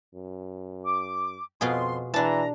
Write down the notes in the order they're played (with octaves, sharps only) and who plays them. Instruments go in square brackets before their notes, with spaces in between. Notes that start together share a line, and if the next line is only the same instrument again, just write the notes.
[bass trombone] F#2
[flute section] D6
[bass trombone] F2 [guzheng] B2 F4 G#4 [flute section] C6
[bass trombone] E3 [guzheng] D4 A5 [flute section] A#5